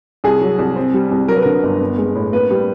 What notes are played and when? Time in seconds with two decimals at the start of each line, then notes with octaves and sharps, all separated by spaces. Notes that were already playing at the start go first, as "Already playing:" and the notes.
0.24 C2 G#4
0.41 F#3
0.59 C2
0.76 C4
0.94 G3
1.11 C2
1.28 F#3 A#4
1.36 B4
1.43 D3 A#4
1.63 G1
1.80 B3
1.98 G#3
2.15 A2
2.32 A#3 B4
2.50 G3